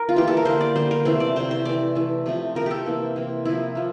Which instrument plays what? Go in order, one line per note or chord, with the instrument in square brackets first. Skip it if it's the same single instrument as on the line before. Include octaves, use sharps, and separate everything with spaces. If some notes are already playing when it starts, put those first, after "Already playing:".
Already playing: [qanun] A#4
F4
E3 G3 A#3 G4
A4
A#4
D3 G3 A#3 C5
D5
D3 G3 A#3 C5
A#4
C3 E3 A3 C5
D5
C3 E3 A3 C5
C5
E3 A3 D5
E3 A3
C3 F3 A3
C3 F3 A3 A#4
G4 A4
C3 E3 A#3
C3 E3 A#3
C3 F3 A#3 E4
F3 A#3